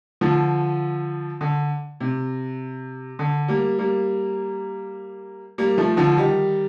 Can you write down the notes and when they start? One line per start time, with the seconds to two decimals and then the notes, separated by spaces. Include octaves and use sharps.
0.21 D3 F3
1.41 D3
2.00 C3
3.19 D3
3.48 G3 A#3
3.79 G3 A#3
5.58 G3 A#3
5.78 F3 A3
5.97 D3 F3
6.17 D#3 G3